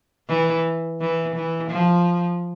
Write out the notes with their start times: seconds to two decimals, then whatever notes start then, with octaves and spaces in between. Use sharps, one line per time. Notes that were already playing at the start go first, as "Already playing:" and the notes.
0.28 E3
1.01 E3
1.36 E3
1.71 F3